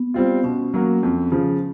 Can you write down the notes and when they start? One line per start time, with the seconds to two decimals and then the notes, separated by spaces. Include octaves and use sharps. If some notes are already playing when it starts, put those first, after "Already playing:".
Already playing: B3
0.14 G3 C4 F4
0.44 B2 C#4
0.74 F#3 A#3
1.03 F2
1.32 C#3 F3